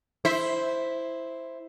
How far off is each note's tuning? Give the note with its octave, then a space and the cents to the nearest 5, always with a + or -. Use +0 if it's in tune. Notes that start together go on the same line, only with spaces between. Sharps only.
E4 +0 C5 +0 E5 -20